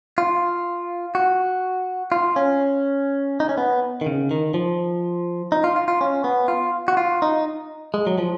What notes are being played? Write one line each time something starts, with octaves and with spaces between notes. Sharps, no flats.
F4
F#4
F4
C#4
D#4
C#4
B3
D#3
C#3
D#3
F3
D#4
F4
F4
F4
C#4
B3
F4
F#4
F4
D#4
G#3
F#3
F3